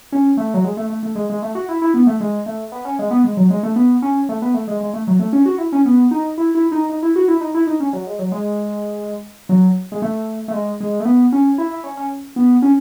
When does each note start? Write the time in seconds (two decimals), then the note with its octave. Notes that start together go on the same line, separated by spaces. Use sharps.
0.12 C#4
0.37 A3
0.54 F#3
0.64 G#3
0.77 A3
0.90 A3
1.03 A3
1.15 G#3
1.30 G#3
1.42 A3
1.55 F#4
1.69 E4
1.82 E4
1.94 B3
2.07 A3
2.20 G#3
2.46 A3
2.72 B3
2.85 C#4
2.99 G#3
3.11 B3
3.24 G#3
3.37 F#3
3.50 G#3
3.63 A3
3.76 B3
4.02 C#4
4.29 A3
4.42 B3
4.54 A3
4.67 G#3
4.81 G#3
4.94 A3
5.07 F#3
5.19 A3
5.33 C#4
5.46 F#4
5.58 E4
5.72 C#4
5.85 B3
6.11 D#4
6.38 E4
6.55 E4
6.71 D#4
6.89 D#4
7.03 E4
7.16 F#4
7.28 E4
7.41 D#4
7.54 E4
7.67 D#4
7.80 C#4
7.93 F#3
8.07 G#3
8.19 F#3
8.32 G#3
9.49 F#3
9.92 G#3
10.02 A3
10.48 A3
10.53 G#3
10.80 G#3
11.00 A3
11.05 B3
11.32 C#4
11.58 E4
11.71 E4
11.84 C#4
11.97 C#4
12.36 B3
12.62 C#4